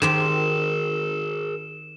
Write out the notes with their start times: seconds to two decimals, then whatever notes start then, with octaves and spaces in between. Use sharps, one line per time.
0.02 D#3 G4 G#4 A#4 C5 E7